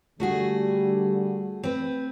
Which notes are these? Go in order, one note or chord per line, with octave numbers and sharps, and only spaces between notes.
D3 G3 A3 F#4 G#4
C4 B4